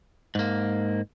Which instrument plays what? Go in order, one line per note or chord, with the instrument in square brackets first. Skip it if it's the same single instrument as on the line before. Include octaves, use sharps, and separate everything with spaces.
[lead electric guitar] G#2 A#3